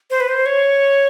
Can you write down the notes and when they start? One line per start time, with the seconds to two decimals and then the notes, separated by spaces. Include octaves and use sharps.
0.10 C5
0.20 B4
0.28 C5
0.46 C#5